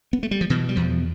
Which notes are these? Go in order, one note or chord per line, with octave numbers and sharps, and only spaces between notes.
B3
A3
G3
F3
B2 E3
G3
E2 F3